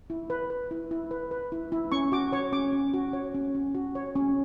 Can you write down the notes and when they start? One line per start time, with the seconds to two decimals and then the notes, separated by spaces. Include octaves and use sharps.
0.10 E4
0.30 B4
0.50 B4
0.71 E4
0.91 E4
1.11 B4
1.31 B4
1.52 E4
1.72 E4
1.92 C#4 C#6
2.12 F#4 D6
2.32 C#5 C#6
2.52 C#4 D6
2.73 C#4
2.94 F#4
3.13 C#5
3.34 C#4
3.55 C#4
3.75 F#4
3.95 C#5
4.15 C#4